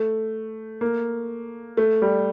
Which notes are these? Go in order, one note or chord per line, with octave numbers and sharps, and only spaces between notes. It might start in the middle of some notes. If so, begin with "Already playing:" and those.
Already playing: A3
A#3
A3
G3